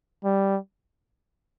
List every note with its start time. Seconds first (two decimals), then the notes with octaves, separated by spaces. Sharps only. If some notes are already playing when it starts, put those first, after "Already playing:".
0.24 G3